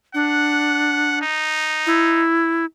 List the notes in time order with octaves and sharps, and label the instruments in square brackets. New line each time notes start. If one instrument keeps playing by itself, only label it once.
[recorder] D4 [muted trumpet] F#5
[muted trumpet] D#4
[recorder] E4